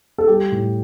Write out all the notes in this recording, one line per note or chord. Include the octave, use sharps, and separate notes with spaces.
A4
G3 G4
A2